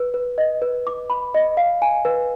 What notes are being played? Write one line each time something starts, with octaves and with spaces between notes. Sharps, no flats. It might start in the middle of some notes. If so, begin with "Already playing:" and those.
Already playing: B4
B4
D#5
B4
D6
B5
D#5
F5
G#5
B4